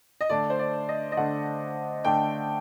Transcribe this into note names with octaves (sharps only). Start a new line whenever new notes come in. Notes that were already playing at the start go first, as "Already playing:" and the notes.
D#5
D3 A3 D4 D5
C5
D5
D#5
D#5
D3 A3 D4 F#5
D3 A3 D4 G5